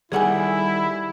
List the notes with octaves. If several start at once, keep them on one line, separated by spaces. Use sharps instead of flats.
D#3 G3 E4 G#4 A4 F#5 G#5